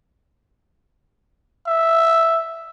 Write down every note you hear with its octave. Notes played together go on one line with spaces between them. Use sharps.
E5